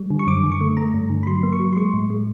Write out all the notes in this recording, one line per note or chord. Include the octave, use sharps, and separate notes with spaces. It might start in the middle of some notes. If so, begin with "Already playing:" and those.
Already playing: G3
D3
C#6
F#2 D6
D3
C#6
A3
A3 A#5
G2
D3
B5
F#3 C6
A#3
C#6
F#3
C6
G#3 C#6
A2
G#3